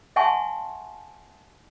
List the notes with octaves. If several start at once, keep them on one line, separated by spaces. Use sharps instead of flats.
E5 F#5 G#5 A5 C6 C#6